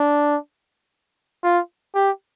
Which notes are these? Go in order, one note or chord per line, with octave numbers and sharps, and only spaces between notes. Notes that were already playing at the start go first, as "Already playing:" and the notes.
Already playing: D4
F4
G4